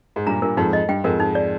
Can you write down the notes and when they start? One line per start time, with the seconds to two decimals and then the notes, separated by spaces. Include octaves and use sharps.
0.16 G#2
0.26 G2 A#2 A#5
0.42 G2 A#2 A#4
0.57 F2 G#2 D#4
0.73 D#5
0.89 G2 G5
1.04 F2 G#2 A#4
1.20 D#4
1.35 D5